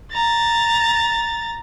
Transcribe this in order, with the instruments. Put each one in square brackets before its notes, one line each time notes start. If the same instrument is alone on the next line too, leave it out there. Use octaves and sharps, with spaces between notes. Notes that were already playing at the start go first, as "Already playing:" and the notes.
[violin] A#5 A6